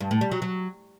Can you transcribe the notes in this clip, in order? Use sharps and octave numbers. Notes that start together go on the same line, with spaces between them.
G2
A2
G3
F#3
F#3